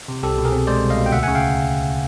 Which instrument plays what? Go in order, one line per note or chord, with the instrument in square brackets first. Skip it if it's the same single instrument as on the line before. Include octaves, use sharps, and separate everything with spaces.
[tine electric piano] C3
C2 G4 A4
B2
G#4 A#4
C4
G#3 C5 D5
C2
D#5 F5
B2
G5
D2 E5 F#5
C#3 F#5 G#5
F5 G5